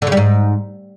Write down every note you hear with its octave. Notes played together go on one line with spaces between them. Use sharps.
D3
C#3
G3
G#2